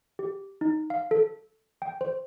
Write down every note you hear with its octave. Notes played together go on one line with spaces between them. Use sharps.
G4
D#4
F5
A4
G5
C5